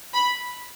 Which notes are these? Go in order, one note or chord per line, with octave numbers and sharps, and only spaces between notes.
B5